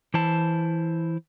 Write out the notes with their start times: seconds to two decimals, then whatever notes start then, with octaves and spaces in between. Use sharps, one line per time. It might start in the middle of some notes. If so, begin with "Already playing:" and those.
0.14 E3 E4 C5 A5